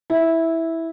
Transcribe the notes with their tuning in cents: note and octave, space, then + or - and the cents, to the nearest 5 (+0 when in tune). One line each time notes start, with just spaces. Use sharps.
E4 -10